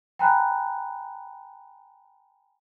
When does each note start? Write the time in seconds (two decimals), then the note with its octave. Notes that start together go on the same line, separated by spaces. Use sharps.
0.19 G5 G#5 A#5 B5 F#6